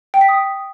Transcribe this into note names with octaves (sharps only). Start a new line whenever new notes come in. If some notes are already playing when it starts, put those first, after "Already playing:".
G5
B6
D#6